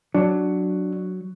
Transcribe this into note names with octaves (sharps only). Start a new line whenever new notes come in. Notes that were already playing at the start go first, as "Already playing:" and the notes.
F#3 D4